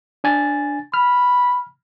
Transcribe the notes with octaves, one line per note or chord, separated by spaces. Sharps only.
D4 G#5 A6
B5 F6